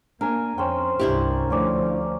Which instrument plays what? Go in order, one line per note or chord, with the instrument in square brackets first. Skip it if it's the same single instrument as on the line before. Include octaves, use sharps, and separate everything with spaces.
[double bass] A#3 [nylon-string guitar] D4 [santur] A#4 G#5
[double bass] F2 [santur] C#4 C5 G5
[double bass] C2 G2 [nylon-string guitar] D4 E4 G4
[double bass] D2 F3 [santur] C#4 D5